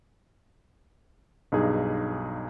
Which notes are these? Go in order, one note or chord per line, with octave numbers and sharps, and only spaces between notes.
B1 G2 D#4 G#4